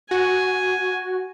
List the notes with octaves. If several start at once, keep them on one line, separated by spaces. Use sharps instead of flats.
F#4 G#5